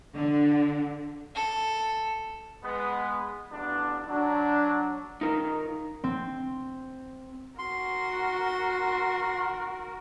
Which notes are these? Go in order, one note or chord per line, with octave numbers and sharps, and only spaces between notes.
D3
A4
G#3 B3
A1 B3 D4
F#3 D4
D#4 F4 A#4
C4
F#4 A#4 C6